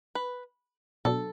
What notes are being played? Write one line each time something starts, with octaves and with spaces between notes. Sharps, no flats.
B4
B2 F#3 B3 D4 F#4 A4